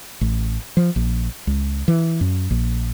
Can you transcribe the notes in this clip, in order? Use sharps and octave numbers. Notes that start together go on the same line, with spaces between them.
A1
F3
A#1
C#2
E3
F#2
A#1